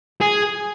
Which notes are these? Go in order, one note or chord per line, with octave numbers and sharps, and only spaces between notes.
G#4